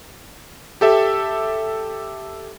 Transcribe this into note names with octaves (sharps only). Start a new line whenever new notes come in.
G4 A4 E5